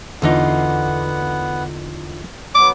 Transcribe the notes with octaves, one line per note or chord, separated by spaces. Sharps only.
E2 D3 E3 B3 D#4 F4 F5 F#5
F#3 B3 D6